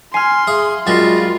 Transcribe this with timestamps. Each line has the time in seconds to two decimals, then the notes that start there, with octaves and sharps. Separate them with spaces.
0.14 G#5 C6 F6 C7
0.47 G#4 E5 F5
0.87 F#2 G3 G#3 F4 A6 A#6 C7